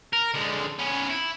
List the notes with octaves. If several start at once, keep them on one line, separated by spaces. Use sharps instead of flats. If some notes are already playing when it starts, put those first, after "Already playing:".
A#4
D3 G#3
B3 C#4
E4